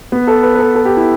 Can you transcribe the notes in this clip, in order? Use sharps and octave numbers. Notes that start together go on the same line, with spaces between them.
B3
A4
B4
B4
A4
A4
G4
E4